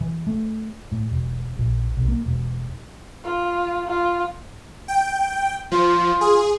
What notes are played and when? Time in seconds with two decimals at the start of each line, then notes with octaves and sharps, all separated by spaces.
0.01 E3
0.27 A3
0.92 A2
1.11 E1
1.58 A#1
1.97 B1
2.08 A#3
2.26 E1
3.24 F4
3.88 F4
4.88 G5
5.71 F3 F4
6.21 G#4